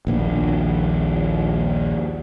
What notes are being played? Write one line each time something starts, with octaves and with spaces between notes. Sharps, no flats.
A#1 D#2 C4 D4